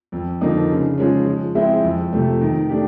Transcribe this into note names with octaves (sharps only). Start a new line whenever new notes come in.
F2
D3 F3 A#3 D#4
C#3
F3 G#3 C#4
F3
G#3 C4 E4
F2
C3 F3 A3
D#3
A3 D4 G4